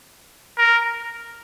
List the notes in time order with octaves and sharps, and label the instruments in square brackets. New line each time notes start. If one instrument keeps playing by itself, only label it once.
[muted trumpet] A#4